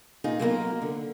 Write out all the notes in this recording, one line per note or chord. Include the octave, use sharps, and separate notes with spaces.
A#2 D#4 F4 G#4
F#3 A#3 B3 E4 F4 A#4
D3